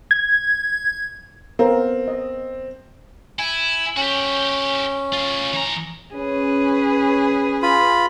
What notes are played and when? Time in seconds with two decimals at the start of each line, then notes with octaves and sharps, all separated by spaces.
0.11 G#6
1.59 B3 C4 A#4 F5
2.08 D#5
3.39 E4 G#5
3.97 C#4 F#4 G4
5.13 F4 G#4
5.53 E3 A#5
6.14 C#4 G#4 B4
7.62 F4 B5